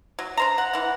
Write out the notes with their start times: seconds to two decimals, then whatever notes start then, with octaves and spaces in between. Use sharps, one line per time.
0.19 F#3
0.37 D4 C5 A#5
0.58 F#5
0.73 E3 F#5